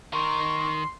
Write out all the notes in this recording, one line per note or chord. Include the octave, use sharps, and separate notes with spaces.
D#3 A#4 C6 C#6